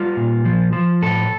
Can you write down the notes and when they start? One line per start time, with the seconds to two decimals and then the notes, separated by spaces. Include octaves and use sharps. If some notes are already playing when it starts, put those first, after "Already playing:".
Already playing: G3 F4
0.17 A#2
0.45 F3
0.73 F3
1.02 A2 A4